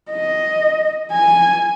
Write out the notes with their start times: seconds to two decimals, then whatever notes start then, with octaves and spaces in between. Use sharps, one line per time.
0.11 D#5
1.12 G#5